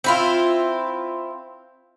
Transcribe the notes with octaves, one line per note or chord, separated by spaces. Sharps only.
C4 E4 F4